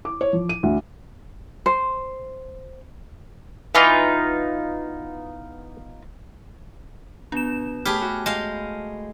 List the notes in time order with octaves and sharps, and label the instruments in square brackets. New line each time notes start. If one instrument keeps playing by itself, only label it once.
[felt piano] D6
C#5
F3
D#7
D2
[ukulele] C5
[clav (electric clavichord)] E3 [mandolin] B3 D#4 F4
[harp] B2 [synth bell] D4 E7
[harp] A2 B5 [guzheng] G4 G#4 [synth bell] A5 F6
[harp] A3 F#4
[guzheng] G#3 F5 [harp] G6